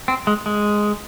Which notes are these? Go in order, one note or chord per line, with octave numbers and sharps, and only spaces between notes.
C4
G#3
G#3